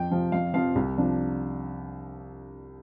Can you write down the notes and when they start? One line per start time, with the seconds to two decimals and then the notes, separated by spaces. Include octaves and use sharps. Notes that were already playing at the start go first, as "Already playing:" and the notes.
Already playing: F2 G5
0.10 C3 F3
0.32 F2 F5
0.54 C3 F3 C4 F5
0.75 C2
0.97 C3 F3 D4